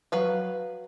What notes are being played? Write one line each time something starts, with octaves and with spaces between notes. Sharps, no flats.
F#3 B4 F5